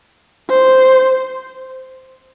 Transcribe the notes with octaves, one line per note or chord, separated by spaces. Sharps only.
C5